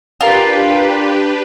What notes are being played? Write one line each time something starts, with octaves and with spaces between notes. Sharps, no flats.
D4 F4 G4 A#4 B4